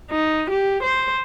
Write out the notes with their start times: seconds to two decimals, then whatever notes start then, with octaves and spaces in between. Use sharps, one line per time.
0.11 D#4
0.50 G4
0.83 C5